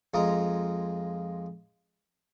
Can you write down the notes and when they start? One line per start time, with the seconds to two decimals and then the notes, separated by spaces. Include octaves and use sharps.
0.14 F2 G#3 F4 D#5 A#5